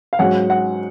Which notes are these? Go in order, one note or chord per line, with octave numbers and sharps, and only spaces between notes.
F5
G#2 F#3 C#4 F#5
F#5